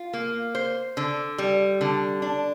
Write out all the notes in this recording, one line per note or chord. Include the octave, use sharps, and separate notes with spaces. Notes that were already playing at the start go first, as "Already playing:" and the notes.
Already playing: F4
A#3
C5
D3
G3
D3
D4